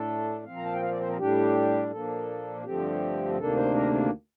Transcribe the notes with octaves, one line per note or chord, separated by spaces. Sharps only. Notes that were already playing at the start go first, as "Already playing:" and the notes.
Already playing: A2 A3 D4 A4
A#2 F3 C4 F5
A#5
A5
G5
F5
D5
C5
A#4
A2 G3 D4 G4
A#2 F3 A#3 D4 A4
G2 D3 F3 A3 C4 G4
D2 C3 D#3 A#3 D4 A4
C5
A#4